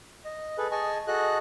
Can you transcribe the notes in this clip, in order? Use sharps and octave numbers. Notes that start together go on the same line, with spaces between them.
D#5
G#4 A4 B4
G#4 D#5 G#5 A5 C#6
F#4 G#4 A4 D#5 F#6